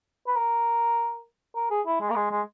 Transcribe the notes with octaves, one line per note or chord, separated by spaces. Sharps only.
B4
A#4
A#4
G#4
E4
G#3
A#3
G#3
G#3